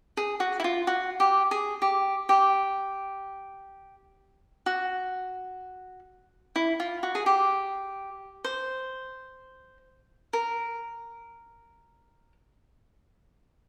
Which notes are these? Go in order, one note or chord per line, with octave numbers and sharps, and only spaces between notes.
G#4
F#4
E4
F4
F#4
G4
G#4
G4
G4
F#4
E4
F4
F#4
G#4
G4
C5
A#4